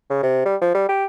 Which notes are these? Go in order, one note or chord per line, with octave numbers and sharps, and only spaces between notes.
C#3
C3
G3
F3
G3
G4